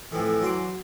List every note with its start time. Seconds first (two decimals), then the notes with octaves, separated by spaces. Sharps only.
0.12 F2 A2 E3
0.41 F#3 C6 D6